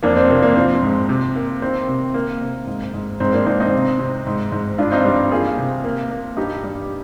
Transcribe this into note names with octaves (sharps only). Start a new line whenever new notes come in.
F2 A#3 D4
C4
C3 A#3
A#3 D4
F3 C4
G#2
C3
A#3
D#3 C4
C3
A#3
C3
G#2
G#2
G#2 C4
A#3 D4
G#2 C4 D#4
C4 D#4
C3
C3
G#2
G#2
G2 D4 F4
C4 D#4
G3
A#3 F4 G#4
C3
A#3
A#3
G2 D#4 G4
G3